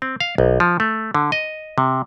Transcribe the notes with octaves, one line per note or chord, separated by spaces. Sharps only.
C4
F5
B1
F3
A3
D3
D#5
C3